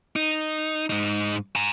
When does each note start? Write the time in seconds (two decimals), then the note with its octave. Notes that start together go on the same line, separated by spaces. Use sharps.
0.16 D#4
0.90 G#2 D#4
1.56 G#5 A#5